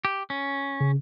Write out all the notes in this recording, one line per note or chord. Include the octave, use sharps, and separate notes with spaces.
G4
C#4
C#3